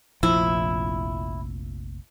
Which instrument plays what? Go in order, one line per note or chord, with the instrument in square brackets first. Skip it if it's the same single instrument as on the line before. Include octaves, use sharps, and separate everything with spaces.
[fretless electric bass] F1 A#1 F3 [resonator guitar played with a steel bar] E4